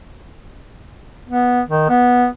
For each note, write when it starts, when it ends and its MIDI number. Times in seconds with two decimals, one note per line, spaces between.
1.29 1.61 59
1.67 1.87 51
1.89 2.26 59